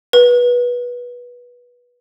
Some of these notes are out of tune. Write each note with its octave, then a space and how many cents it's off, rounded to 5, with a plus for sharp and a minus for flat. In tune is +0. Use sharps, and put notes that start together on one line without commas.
B4 -20